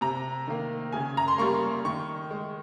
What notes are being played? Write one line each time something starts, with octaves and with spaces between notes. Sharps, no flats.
C3 A#5
D#3 A#3
C#3 G#5
A#5
C6
G3 A#3 C#6
D#3 C#6
G#3